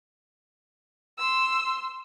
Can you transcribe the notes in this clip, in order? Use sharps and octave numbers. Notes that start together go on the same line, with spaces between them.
C6 E6